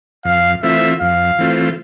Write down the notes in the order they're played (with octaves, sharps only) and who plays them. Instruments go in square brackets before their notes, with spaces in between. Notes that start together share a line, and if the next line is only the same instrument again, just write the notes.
[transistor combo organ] F2 [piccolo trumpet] F5
[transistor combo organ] E3 A3 C4 F4 [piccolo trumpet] E5
[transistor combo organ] F2 [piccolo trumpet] F5
[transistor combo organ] E3 A3 C4 F4